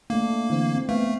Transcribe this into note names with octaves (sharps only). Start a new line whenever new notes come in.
A3 A#3 D4
D3 E3 C4
C4
A3 B3 F5